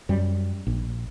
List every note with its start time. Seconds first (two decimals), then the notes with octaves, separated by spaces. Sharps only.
0.09 F#2 G3
0.67 A#1